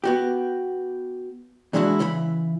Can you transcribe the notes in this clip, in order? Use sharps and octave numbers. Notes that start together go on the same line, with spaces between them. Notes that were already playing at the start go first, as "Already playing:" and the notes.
B3 F#4 G4
A#2 E3 G#3 D4 E4 F#4
C#3 E3 E4 B5